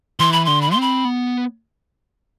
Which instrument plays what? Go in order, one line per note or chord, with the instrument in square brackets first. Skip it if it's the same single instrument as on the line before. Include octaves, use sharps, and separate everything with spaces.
[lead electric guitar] E3 [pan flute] C6
[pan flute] B5
[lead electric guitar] D3 [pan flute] C6
[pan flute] B5
C6
[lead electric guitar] C4
[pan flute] B5
[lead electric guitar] B3